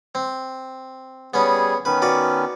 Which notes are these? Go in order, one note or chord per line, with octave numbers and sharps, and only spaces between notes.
C4
G3 B3 C#4 G#4
D#3 B3 C#4 B4
F#4 B4 D5